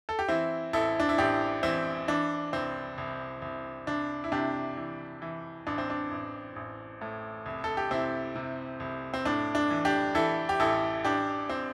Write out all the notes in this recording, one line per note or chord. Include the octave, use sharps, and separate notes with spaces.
A4
G4
E3 C4 E4
A1 E4 A4
D4
E4
A1 D4 G4
E3 C4 E4
E3 D4
C2 C4
C2
C2
C2 D4
E4
C3 D4 G4
E3
E3
A1 D4
C4
D4
A1
A1
A2
C2
A4
G4
C3 C4 E4
C3
C2
C4
A2 D4
D4
E3
D4 G4
E3 E4 A4
G4
A1 E4 A4
A1 D4 G4
C4